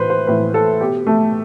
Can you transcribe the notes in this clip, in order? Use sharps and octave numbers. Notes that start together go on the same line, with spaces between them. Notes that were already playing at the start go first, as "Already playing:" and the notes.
Already playing: A2 E3 B4 C5
C5
A2 E3 B4
A4
B2 G4
A3